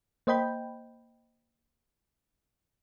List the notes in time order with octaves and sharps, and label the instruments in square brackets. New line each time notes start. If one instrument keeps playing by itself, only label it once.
[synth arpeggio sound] A#3 C5 D#5 G5 B5 G6